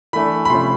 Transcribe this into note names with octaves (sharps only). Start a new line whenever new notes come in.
E3 A3 D4 B5
B5
C3 F3 A3 C#4 C6